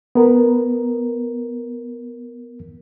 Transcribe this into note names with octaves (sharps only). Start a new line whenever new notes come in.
B3 A#4